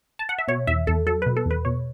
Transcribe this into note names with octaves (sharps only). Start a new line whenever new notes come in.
A5
F#5
E5
B2 C#5
E2 E5
E2 A4
F#3 A4
B2 B4
A4
E2 B4
B2 C#5